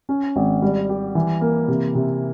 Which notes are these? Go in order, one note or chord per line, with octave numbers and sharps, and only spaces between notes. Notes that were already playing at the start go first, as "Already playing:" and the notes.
C#4
G#1
G3
G4
E3
A#3
C3
C3